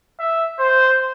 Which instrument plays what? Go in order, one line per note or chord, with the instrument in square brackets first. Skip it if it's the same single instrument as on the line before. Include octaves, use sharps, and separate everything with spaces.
[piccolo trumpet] E5
C5